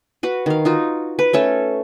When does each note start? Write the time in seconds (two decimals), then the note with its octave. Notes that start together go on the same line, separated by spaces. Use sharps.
0.23 F#4 B4
0.46 D#3 F5
0.65 D#4 F4 F#4
1.19 B4
1.33 A3 C#4 A4